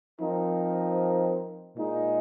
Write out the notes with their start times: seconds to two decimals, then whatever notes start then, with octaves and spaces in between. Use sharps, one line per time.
0.20 F3 C4 D#4 A#4
1.76 A#2 G#3 D#4